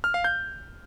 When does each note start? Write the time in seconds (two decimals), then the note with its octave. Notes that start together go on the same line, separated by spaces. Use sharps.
0.04 F6
0.14 F5
0.24 G6